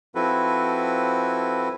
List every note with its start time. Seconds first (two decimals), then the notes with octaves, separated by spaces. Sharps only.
0.15 F3 C4 E4 F#4 A4 B4